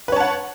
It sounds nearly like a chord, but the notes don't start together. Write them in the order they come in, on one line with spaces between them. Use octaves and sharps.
B4 C#5 A5 F#5